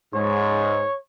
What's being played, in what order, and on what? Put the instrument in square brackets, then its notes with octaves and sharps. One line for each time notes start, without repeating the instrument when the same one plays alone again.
[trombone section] G#2 [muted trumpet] C#5